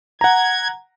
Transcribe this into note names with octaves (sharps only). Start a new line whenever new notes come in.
F#5 A#5 G#6